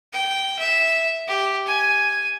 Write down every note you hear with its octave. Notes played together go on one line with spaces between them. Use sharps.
G5
E5
G4
G#5